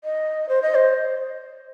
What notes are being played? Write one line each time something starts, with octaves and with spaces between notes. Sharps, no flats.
D#5
C5
D#5
C5